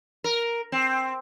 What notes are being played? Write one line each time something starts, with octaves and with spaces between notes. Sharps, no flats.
A#4
C4